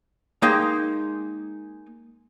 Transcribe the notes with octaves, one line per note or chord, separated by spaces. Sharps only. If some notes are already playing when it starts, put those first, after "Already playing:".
G#3 A#3 D#4 F5 G5